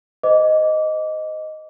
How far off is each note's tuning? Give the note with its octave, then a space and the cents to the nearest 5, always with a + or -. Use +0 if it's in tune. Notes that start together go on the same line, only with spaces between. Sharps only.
C5 -35 D#5 +0 D6 -20